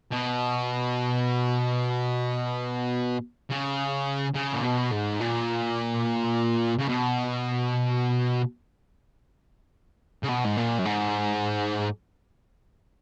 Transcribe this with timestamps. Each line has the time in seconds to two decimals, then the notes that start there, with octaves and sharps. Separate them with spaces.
0.12 B2
3.50 C#3
4.35 C#3
4.54 A#2
4.63 B2
4.92 G#2
5.21 A#2
6.79 C#3
6.89 B2
10.24 C#3
10.29 B2
10.45 G#2
10.57 A#2
10.79 F#2
10.85 G#2